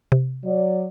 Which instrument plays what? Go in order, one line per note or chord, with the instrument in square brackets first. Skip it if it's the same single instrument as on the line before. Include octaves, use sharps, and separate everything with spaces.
[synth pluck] C3
[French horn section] F#3 D5